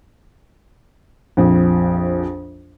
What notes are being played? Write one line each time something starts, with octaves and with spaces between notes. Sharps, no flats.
A#1 F2